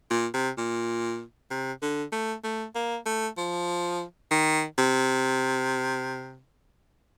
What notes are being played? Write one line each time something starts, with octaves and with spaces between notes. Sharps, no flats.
A#2
C3
A#2
C3
D3
A3
A3
A#3
A3
F3
D#3
C3